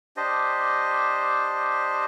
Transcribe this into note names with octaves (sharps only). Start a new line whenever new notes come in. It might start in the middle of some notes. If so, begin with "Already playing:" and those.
D4 G4 C5 D#5